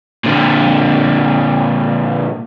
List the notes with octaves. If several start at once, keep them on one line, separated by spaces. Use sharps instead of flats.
A#2 D3